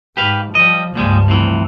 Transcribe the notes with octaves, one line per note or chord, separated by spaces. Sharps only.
G#2 G4 B4 F5
F3 G3 D#5
C#2 G2 A#2 F3 G3 G#3
A2 C3 E3